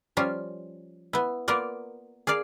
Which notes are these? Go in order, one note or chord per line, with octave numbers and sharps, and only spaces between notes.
F3 G3 C#4 F4
B3 E4
A#3 B3 F4 A#4 D5
G#4 A#4 D5 F5